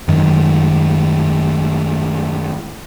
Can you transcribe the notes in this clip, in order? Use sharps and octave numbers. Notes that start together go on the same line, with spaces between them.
F#2 D#3 G#3